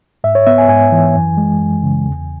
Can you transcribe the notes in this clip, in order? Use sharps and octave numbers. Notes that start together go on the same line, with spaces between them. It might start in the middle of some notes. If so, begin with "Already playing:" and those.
G#2 E5
C#5
B3 E5
G#5
G#2 G#5
E3
F#2
G#3
F#2
C#3
E2